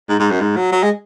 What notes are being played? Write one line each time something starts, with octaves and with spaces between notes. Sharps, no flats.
G#2
G#2
F#2
G#2
F#3
F#3
G#3